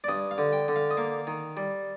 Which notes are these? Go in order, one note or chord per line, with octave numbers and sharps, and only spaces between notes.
D5
G2 D#5
F5
D3
G5
D3
F5
D#5
A#3 F5
D#3
G3